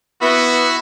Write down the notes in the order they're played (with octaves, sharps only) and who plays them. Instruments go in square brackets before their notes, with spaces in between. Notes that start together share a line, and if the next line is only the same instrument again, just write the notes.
[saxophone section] B3 [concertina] E4 B5 E6 [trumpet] F#4